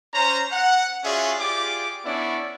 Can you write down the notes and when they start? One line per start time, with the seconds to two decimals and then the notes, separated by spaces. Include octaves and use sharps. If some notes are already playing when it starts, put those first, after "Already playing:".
0.14 C#4 C5 A#5
0.52 F#5
1.04 C#4 F4 F#4 G#4 D5 E5
1.39 F4 G4 G#4 D5 D6
2.05 B3 C#4 D4 E4 C#5 D5